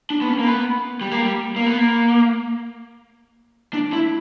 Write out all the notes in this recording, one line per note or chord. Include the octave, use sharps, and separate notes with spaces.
D4
B3
C#4
A#3
B3
G3
A#3
G3
A#3
B3
A#3
D4
E4